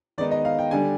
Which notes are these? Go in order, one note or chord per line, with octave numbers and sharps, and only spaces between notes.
D#3 G#3 B3 D#4 D5
D#5
F5
G5
D3 G3 D4 G#5